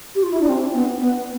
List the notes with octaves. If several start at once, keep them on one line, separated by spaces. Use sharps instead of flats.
G4
F4
E4
D4
C4
B3
B3